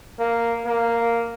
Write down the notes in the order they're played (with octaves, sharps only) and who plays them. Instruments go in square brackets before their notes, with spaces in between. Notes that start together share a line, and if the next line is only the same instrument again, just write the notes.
[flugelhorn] A#3
A#3